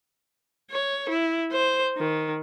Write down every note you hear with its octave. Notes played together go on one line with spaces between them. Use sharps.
C#5
E4
C5
D#3